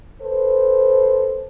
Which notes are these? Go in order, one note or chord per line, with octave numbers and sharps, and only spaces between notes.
A4 B4 C5